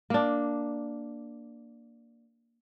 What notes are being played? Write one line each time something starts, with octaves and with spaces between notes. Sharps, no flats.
A#3 D4